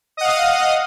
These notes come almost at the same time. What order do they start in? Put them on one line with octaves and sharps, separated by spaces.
D#5 F#5 F5 D#6